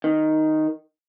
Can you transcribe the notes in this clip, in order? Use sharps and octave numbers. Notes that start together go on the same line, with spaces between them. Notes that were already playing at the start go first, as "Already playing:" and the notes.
D#3